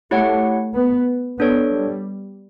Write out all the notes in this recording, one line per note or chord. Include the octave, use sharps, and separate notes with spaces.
A3 E4 G4 C#5 F#5
B3
B3 D4 A4 C#5
G3